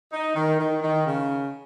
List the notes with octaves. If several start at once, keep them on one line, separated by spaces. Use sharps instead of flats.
D#4
D#3
D#3
D#3
C#3